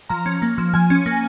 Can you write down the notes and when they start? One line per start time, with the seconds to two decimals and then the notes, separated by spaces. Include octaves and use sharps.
0.09 F3 A#5
0.26 C#4
0.42 A#3
0.58 F3
0.74 F3 G#5
0.90 C#4
1.06 A#3